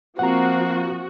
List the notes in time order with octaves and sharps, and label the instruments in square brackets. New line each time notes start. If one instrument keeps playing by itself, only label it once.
[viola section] F3 F#4 [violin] A#3 C4 [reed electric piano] F#5 A#5